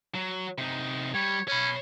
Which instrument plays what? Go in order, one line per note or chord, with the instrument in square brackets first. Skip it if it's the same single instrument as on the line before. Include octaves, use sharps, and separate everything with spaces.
[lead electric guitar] F#3
C3 D#4
[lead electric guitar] G3 [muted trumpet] C#5
[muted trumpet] C#4 [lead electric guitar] C#5 B5